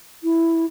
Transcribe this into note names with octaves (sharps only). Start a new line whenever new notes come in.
E4